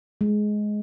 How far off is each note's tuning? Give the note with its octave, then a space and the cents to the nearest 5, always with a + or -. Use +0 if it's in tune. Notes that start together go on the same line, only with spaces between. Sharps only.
G#3 +15